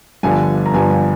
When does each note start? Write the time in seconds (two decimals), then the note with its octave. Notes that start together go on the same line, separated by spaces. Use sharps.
0.23 G1 G2 D3 F3 G#5
0.66 A#5
0.74 G1 G2 D3 F3 G#5
0.91 G#5